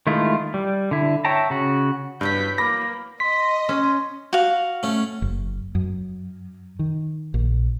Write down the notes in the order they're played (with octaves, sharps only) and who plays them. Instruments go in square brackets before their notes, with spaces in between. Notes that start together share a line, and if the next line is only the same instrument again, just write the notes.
[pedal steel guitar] D#3 G#3 A3 E4 F4
G3
D3 E4
C#5 E5 G5 A5 A#5
C#3 F#4
[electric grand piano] G2 [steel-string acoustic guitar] E3 F#3 B3 [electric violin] G6 B6
[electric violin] A#3 [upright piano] B5 D6 [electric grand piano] A#6
[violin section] D#5 [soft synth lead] C6 [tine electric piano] B6
[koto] C#4 [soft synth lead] C6
[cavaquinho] F#4 F5
[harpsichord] A3 C#4
[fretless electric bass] F#1
F#2
D#3
A#1